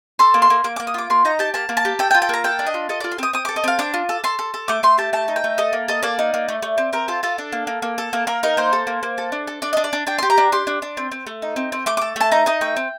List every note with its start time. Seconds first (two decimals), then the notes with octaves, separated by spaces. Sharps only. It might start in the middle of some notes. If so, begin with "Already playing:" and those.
0.19 A4 C6
0.34 A#3
0.42 C6
0.50 A#3
0.64 A#3 D6
0.76 A#3 D6
0.87 D#6
0.94 F4 D6
1.10 A#3 C6
1.25 D#4 A#5
1.39 G4 A5
1.54 A#3 A5
1.69 A#3
1.77 A5
1.85 G4
1.99 A4 G5
2.11 G5
2.14 F4
2.22 G5
2.29 A#3 A#5
2.44 A4 G5
2.59 D4
2.66 D#5
2.74 F4
2.89 A4 D#5
3.00 F4 D5
3.11 C6
3.18 C4 D#6
3.33 C4 D#6
3.45 A4 D6
3.56 D#5
3.64 C4 F5
3.79 D4 D6
3.94 F4
4.09 A4
4.24 A4 C6
4.39 A4
4.54 A4
4.68 A3 D6
4.83 A3 C6
4.98 G4 A5
5.13 A3 A5
5.28 D#4
5.36 G5
5.44 A3
5.58 A4 D#5
5.73 A#3
5.88 A4 D#5
6.03 A#3 D5
6.19 D#4
6.34 A#3
6.48 A3
6.62 A3
6.78 C4
6.93 C4 A#4
7.08 F4 A4
7.23 F4 A4
7.38 D4
7.52 A#3
7.67 A#3
7.82 A#3
7.98 A4
8.13 A#3
8.27 A#3 A#4
8.43 D#4 A#4
8.57 A#3 C5
8.73 A4
8.87 A#3
9.03 A#3
9.18 A4
9.32 D4
9.47 A4
9.62 D4 D5
9.73 D4 D#5
9.84 D5
9.93 D4
10.07 D4 G5
10.18 G4 C6
10.30 A#5
10.38 D4
10.52 G4 C6
10.67 D4
10.82 D4
10.97 C4
11.12 C4
11.27 A3
11.42 D#4
11.56 C4
11.72 C4
11.86 A3 D6
11.97 A4 D6
12.16 A3 A5
12.32 D#4 A#5
12.46 D#4 D#5
12.61 A3 G5
12.76 C4